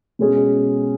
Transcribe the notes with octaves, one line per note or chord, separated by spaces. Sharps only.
B2 G#3 C#4 G#4